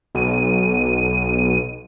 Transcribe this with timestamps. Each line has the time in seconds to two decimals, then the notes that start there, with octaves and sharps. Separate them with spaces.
0.15 B1 D#7